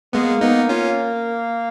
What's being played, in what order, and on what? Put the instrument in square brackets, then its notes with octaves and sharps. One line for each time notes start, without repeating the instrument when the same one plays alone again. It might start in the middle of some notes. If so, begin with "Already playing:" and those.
[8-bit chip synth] G#3 B3 [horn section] A#3
[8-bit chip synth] B3 D#4
C#4 F4